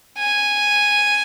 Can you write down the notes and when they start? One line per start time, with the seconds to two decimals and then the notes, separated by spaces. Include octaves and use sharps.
0.18 G#5